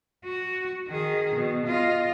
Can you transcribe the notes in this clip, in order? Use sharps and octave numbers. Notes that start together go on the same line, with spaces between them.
F#4
D#3 G#4
B2
F4 D#5